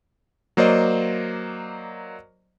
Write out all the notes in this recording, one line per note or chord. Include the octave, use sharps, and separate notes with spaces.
F#3 A#3 C5 D5 D#5